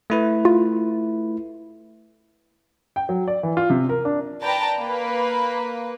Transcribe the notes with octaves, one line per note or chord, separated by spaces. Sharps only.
A3 E4 B4
F4
G5
F#3
D5
E3
F4
C3
A#4
D4
B4 D5 G5 A5 A#5
A#3 B4